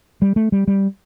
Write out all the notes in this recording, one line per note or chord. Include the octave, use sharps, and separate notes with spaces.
G3
A3
G3
G3